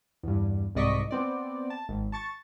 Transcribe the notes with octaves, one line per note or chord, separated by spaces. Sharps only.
E2 G2
C2 G#2 D5 D#5 C#6 B6
B3 C4 D5
A5
G#1
A5 C#6 A6